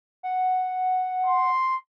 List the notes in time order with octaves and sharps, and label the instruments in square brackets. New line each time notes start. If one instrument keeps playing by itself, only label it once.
[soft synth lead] F#5
[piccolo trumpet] C6